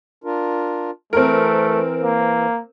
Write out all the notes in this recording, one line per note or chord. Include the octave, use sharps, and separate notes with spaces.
D4 F4 A#4
E3 A3 C4 A#4
A#3